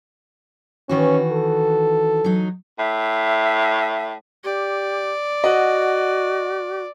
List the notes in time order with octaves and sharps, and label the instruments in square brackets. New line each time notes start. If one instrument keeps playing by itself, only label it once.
[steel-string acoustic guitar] D#3 E3 F#4 [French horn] C#4
[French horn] A4
[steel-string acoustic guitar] F#3 D#4
[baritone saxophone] A2 [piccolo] E5
[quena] G4 [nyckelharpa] D5
[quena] F#4 [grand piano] D#5 F#5